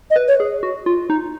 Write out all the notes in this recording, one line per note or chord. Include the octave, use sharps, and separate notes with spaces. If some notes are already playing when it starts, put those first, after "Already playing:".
D#5
B4
C#5
G#4
F#4
F4
D#4